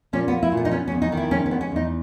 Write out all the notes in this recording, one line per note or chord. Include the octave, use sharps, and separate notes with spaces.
A#2 C#4
B3
A#3
E4
A#2
B3
D#4
B3 C#4
C#4
E2
D#4
D#3
E4
G#3 C#4
C#4
B3
C#4
E2 D#4